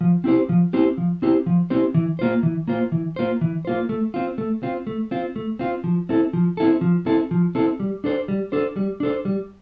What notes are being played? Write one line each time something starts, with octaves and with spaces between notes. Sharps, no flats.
F3
C4 E4 G4 C5
F3
C4 E4 G4 C5
F3
C4 E4 G4 C5
F3
C4 E4 G4 C5
E3
A#3 F4 C5
E3
A#3 F4 C5
E3
A#3 F4 C5
E3
A#3 F4 C5
A3
C4 F4
A3
C4 F4
A3
C4 F4
A3
C4 F4
F3
C4 E4 A4
F3
C4 E4 A4
F3
C4 E4 A4
F3
C4 E4 A4
G3
D4 A4 C5
G3
D4 A4 C5
G3
D4 A4 C5
G3